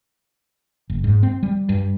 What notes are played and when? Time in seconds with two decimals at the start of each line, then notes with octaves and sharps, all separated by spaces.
0.90 F#1
1.04 G#2
1.23 C4
1.43 G3
1.69 G2